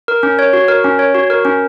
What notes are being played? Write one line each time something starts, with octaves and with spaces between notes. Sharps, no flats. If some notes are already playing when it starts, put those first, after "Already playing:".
A#4
C#4
C#5
F#4
A#4
C#4
C#5
F#4
A#4
C#4